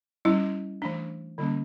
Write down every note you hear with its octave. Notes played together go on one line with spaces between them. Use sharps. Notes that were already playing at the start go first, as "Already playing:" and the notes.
G3 C#4 E4
E3 A3 D4
D3 G3 A#3 C#4